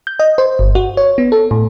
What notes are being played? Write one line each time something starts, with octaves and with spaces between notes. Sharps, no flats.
G6
D#5
C5
G1
F#4
C#5
B3
A4
A2